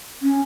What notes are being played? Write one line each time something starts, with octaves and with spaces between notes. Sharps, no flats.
C#4